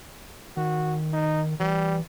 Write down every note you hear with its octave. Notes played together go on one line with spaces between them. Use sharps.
D#3 F#4
D#4
E3 G3